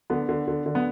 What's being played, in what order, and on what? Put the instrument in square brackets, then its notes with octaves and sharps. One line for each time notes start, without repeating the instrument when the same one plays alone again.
[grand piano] D3 B3
D3
D3
D3
B3